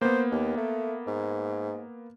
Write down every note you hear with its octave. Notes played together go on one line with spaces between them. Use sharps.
A#3 B3 C5
D#2
A3
G#2